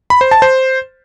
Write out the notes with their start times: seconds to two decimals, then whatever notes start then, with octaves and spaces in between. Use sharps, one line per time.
0.10 B5
0.21 C5
0.31 A5
0.42 C5